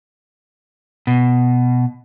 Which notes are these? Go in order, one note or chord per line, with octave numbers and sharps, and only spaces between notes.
B2